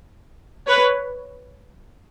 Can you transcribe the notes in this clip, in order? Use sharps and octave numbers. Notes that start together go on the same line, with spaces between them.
B4 C#5